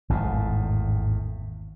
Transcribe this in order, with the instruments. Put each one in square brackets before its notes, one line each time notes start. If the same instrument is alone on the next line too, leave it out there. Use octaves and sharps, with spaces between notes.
[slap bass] G#1 E2 A2